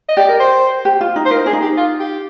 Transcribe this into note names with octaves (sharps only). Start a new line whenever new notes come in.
D#5
G4 D5
A#4
C5
G4
F4
D#4
C5
F4 A#4
D#4
D4 G#4
D#4
G4
F4
G4